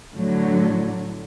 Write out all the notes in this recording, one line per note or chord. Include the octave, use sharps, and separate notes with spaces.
A2 D3 F#3